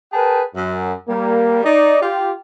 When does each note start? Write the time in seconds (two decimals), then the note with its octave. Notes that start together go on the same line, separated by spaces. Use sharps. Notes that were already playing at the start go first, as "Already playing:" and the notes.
0.13 G#4 A#4 B4 G5 A5
0.54 F#2
1.08 G3 A#3
1.64 D#4 D5
2.02 F4 G4